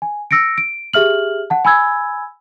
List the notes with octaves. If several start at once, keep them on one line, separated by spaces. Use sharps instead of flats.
G#5
E6 A#6 C#7 D7
D7
G4 G#4 E5 F6 F#7
F#5 A5
G#5 B5 E6 G#6